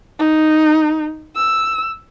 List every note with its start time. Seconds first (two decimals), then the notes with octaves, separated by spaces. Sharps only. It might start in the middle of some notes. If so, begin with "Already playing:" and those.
0.19 D#4
1.36 E6